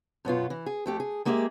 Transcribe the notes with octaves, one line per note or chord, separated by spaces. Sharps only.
F#2 B2 B3 F4
E3
G#4
F2 A3 G4
G#4
G#3 A#3 G4 G#4 D5 E5